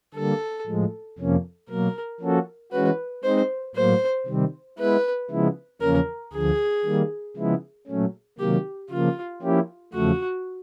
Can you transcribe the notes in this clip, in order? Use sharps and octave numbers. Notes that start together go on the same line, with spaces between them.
D3 G3 A#3 A4
A2 F3 G#3
F2 C3 F3 A#3 C#4
B2 F#3 A#3 A#4
F3 A#3 C#4 F#4 A4
E3 G#3 C#4 F#4 B4
G#3 C4 D#4 C5
A2 F#3 A#3 C5
C3 D#3 G3 C4
G#3 B3 E4 B4
C#3 F3 G#3 B3 E4
E2 C#3 F3 A#3 C#4 A#4
D2 D3 F3 G#4
D#3 G3 A#3
C#3 F3 G#3 B3 E4
A#2 F#3 A3 C#4
C3 D#3 F#3 A#3 G4
C#3 F3 A#3 F4
F3 A#3 C#4 E4 G4
E2 C#3 F3 A3 F#4